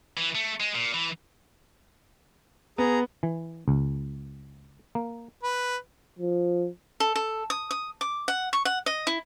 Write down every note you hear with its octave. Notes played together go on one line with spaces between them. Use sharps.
E3
A3
G#3
A#2
E3
B3 G#4 A#5
E3
C#2
A#3
B4
F3
A4
A4
D#6
D#6
D6
F#5
C#6
F#5
D#5
E4